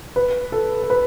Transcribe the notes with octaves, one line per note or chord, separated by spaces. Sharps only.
B4
A4
A4
B4